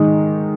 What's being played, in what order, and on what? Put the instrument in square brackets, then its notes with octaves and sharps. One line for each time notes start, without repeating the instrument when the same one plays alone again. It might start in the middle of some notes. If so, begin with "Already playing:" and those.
Already playing: [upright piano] G#2 D#3 G#3 D#4